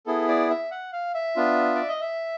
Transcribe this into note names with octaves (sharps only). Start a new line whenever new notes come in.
B3 E4 G#4 A4
D5
E5
F#5
F5
E5
B3 D4 F4
D5
D#5
E5